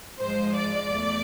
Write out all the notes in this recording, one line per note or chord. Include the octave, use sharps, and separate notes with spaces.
G#2 F3 G#3 C5
D5
E2 A3